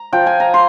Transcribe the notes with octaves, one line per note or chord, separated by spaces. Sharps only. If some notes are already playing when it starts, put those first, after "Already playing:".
Already playing: A#5
F3 G5
G#5
A#5
C6